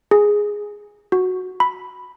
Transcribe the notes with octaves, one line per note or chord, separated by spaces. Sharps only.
G#4
F#4
B5